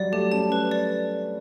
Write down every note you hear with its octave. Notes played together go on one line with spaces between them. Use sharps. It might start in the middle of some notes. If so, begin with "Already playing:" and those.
Already playing: F#3 G3 D5
A3 G4
C#4 A5
B4
D5